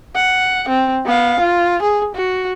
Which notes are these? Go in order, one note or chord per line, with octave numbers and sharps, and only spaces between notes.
F#5
C4
B3 F5
F4
G#4
F#4